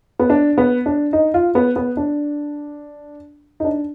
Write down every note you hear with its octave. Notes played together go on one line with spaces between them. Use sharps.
B3
D4
B3
D4
D#4
F4
B3
B3
D4
D#4
D4